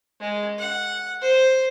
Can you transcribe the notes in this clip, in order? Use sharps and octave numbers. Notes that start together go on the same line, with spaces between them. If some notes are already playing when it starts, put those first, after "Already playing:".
G#3
F#5
C5